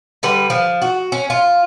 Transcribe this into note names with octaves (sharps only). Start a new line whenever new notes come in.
D3 G3 B4
F3
F#4
C#4
F4